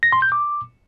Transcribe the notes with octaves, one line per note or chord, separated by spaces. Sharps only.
A#6
C6
G6
D6